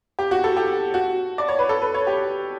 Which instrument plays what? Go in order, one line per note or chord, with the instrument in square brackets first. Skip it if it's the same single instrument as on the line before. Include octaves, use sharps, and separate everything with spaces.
[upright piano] G4
F#4
A4
G4
F#4
D5
C#5
B4
A4
B4
C#5
G4